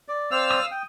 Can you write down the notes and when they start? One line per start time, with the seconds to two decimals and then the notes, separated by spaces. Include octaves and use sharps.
0.08 D5
0.31 C4 C5 D5 F5 E6 F6
0.51 D#6
0.71 G5